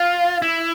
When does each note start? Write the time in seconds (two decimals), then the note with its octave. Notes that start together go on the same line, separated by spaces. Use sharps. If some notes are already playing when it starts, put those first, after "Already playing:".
Already playing: F4
0.42 E4